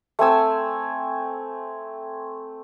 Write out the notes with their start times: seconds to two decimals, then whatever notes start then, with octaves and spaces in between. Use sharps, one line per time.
0.19 A3 C4 G#5 E6